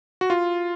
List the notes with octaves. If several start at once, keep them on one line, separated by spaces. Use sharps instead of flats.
F#4
F4